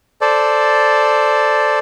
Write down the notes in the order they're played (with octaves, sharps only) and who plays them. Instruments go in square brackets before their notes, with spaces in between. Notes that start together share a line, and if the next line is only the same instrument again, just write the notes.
[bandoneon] A4 C5 D5